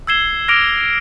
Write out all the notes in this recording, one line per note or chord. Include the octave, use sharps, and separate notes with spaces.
E6 G#6 C7 E7 G7
D6 F6 A#6 D7 F7